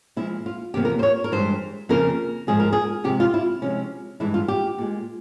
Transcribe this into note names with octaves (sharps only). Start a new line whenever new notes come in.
A#2 F3 G#3 E4
F4
E2 C3 F3 A#3 G4
A#4
C5
C#5
A#4
G2 E3 G#3 C5
F2 C#3 F3 A#3 A#4
G#2 F3 G#3 G#4
A#4
G#4
C3 F3 G#3 G4
F4
E4
C3 F3 G#3 C#4
G2 E3 G#3 E4
F4
G4
A#2 G#3